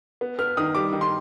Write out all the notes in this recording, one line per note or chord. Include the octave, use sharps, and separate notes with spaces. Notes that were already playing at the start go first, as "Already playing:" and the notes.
B3
B3 F6
D#3 D#6
G3 D6
D#3
C6